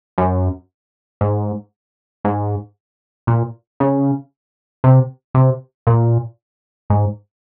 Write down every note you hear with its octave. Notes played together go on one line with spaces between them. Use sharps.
F#2
G#2
G#2
A#2
C#3
C3
C3
A#2
G#2